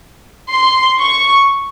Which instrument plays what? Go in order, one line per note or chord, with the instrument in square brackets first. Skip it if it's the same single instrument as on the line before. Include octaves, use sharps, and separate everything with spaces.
[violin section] C6
C#6